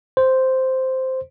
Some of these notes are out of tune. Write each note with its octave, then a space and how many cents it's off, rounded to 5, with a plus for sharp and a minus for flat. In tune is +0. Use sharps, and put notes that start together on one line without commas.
C5 -5